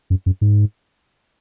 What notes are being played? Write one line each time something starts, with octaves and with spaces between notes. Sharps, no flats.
F#2
F#2
G#2